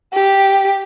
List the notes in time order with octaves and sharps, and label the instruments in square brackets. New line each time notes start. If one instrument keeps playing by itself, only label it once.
[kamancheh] G4